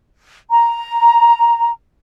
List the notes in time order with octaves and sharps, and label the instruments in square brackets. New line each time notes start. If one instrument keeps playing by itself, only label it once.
[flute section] A#5